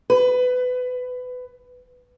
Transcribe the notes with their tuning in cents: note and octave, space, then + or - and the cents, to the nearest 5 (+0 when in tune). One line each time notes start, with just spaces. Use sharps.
B4 +20